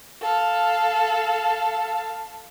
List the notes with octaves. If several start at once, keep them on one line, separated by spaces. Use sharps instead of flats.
A4 F5